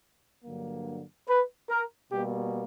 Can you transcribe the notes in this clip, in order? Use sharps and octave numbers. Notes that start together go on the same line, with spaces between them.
G2 D3 F#3 A#3
B4
A#4
B2 G3 A#3 G4